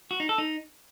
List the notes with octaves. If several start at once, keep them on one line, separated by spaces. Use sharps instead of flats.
F#4
D#4
A4
D#4